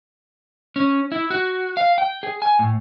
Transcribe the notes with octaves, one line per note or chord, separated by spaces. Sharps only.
C#4
E4
F#4
F5
G5
G#4
G#5
A2